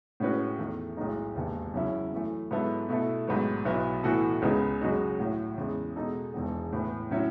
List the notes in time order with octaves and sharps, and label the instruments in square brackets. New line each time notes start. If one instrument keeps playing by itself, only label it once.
[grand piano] A2 G#3 C#4 F#4 B4
E2 D#3 A3
B1 A2 G#3 D#4
E1 D#2 D#3
F#2 C#3 F#3 C#4 E4
F#2 E3 A3
G#2 F#3 B3 E4 A4
B2 A3 E4 A4
A1 G#2 F#3 B3
B1 B2 F#3 B3 E4
A2 E3 B3 F#4 A4
C#2 C#3 G#3 B3 D#4
F#2 C#3 G#3 D#4 F#4
A1 A2 F#3
E2 C#3 G#3
B2 G#3 D#4 A4
E1 E2 D#3 G#3
A2 E3 B3
A2 F#3 C#4 E4